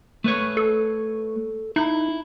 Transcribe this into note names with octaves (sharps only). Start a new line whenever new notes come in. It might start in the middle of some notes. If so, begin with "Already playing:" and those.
A3 B4 C#5
A4
D#4 E4